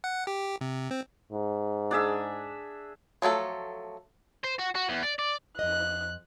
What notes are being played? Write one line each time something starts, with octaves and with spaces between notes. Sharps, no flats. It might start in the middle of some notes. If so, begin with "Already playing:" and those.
F#5
G4
C3
C4
G#2
D4 G#4 E5
F3 F#3 A3 A4
C5
F#4
F#4
E2
D5
D5
F2 D#5 F#6